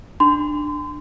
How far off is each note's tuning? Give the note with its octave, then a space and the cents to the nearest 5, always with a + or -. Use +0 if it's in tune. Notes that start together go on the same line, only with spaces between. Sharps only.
D4 +15 C6 -30